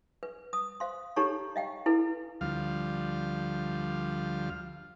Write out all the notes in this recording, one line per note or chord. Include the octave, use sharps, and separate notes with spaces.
B4
D#6
C5 F5 C6
D#4 G4 A4 C#5 A#5 C#6
D#5 F5 G5
E4 A4 B4
D2 F3 G3 F5